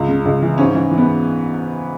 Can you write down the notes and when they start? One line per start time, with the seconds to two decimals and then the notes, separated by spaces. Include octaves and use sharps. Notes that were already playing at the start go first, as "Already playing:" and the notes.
Already playing: C#2
0.08 C#3
0.25 C#2
0.42 E3
0.58 G#2 C#4
0.75 E3
0.91 E3
0.98 B3